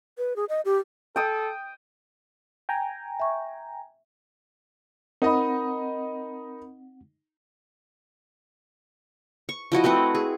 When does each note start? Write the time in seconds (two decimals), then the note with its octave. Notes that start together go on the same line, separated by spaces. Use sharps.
0.18 B4
0.36 G#4
0.49 D#5
0.65 G4
1.16 A4 G5 D#6
2.69 G5 G#5 A#5
3.20 E5 C#6
5.22 C4 D#4 A#4 D#5 F#5 B5
9.49 C#6
9.72 F3 E4 F#4 D#5
9.84 A3 C4 B4 F#5
10.15 G#4